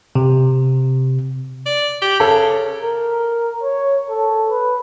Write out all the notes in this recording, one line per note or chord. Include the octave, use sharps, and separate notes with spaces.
C3
D5
G4
C#3 A4
A#4
C#5
A4
B4